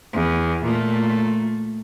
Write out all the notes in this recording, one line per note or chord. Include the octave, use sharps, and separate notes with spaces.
E2
A#2 A3